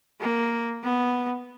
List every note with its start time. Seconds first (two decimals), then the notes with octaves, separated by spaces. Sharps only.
0.21 A#3
0.84 B3